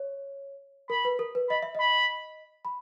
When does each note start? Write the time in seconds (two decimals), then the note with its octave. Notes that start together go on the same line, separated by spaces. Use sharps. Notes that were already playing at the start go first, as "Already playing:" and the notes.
Already playing: C#5
0.90 A#4 B5
1.05 B4
1.19 A#4
1.35 B4
1.50 D#5 B5
1.63 E5
1.75 D#5
1.80 B5
2.65 B5